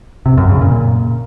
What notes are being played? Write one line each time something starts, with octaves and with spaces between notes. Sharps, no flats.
C3
F#2
C#3
A#2